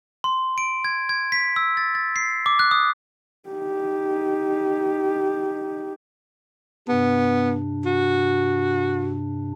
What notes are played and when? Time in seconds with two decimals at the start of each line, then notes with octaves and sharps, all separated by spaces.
0.24 C6
0.58 D7
0.85 G#6
1.09 G#6
1.32 B6
1.56 E6
1.77 A6
1.95 A6
2.16 C7
2.46 D6
2.59 F#6
2.71 D#6
3.49 D#4 G4
6.88 G2 C3 B3 D4
7.85 F#4